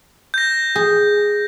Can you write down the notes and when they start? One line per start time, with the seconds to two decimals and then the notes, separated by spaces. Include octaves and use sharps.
0.34 G6 A#6
0.76 G#4